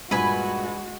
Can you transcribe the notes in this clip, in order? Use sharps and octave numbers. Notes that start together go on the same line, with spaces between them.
G2 A#2 G#3 F#4 B4 G#5